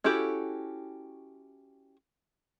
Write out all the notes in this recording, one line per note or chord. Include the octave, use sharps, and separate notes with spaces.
C#4 E4 F#4 G4 A4